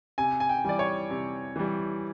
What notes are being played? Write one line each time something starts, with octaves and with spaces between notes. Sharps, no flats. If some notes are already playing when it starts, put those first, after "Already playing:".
C3 G#5
G#5
G5
E3 G3 D5
C#5
C3
E3 G3